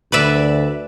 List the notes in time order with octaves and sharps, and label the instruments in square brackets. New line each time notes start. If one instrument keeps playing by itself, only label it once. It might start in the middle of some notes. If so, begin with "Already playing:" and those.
[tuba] D2 [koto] B4 D5 E5